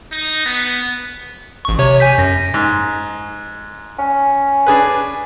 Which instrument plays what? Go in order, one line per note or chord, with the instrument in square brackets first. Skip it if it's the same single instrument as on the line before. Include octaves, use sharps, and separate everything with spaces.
[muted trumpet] D#4
B3
[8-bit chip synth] A1 C#6
C3 C#5
G#5 G6 B6
F#2 A#6
[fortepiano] G#2
[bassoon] C#4
[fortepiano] D4 G#4 B4